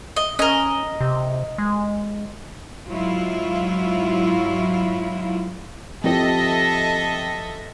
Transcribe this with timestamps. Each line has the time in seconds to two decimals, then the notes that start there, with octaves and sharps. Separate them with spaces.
0.16 D#5
0.39 C#4 A#4 D#5
1.01 C3
1.58 G#3
2.88 G#2 F#3 E4 F4
6.04 F3 C4 G4 A4 D#5 E5